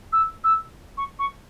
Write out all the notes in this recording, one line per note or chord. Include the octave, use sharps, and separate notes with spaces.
E6
E6
C#6
C#6